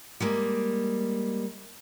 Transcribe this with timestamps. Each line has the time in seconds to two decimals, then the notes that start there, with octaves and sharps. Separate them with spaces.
0.20 G3 G#3 A#3